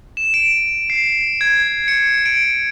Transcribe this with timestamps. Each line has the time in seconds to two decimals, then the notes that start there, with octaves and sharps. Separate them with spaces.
0.17 E7
0.34 D7
0.90 C7
1.41 G#6
1.88 C#7
2.25 D7